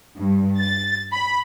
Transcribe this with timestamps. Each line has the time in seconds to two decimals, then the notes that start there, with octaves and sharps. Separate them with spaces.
0.17 G2
0.61 A6
1.13 B5